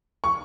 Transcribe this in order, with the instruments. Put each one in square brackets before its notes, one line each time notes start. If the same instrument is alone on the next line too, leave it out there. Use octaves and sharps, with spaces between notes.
[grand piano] C#6